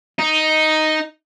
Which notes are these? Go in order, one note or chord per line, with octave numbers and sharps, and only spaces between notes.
D#4